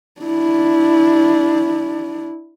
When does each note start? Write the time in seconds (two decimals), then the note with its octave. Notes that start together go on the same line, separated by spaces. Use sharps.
0.21 D4 E4